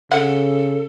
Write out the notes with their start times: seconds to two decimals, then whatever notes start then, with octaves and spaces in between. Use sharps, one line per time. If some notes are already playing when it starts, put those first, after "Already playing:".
0.11 C#3 A4 F#5